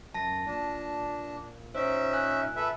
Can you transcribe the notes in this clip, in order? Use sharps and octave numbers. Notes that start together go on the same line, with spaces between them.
F#2 A5 A#6
A#2 D4
C#4 D#4 C5 E5
G#5 F#6
A4 B4 E5